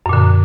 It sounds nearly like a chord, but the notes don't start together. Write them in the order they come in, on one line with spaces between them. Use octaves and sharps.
F#2 A#2 D3